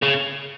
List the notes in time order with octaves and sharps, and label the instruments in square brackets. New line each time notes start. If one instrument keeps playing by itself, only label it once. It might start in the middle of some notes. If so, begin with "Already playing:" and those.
[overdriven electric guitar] C#3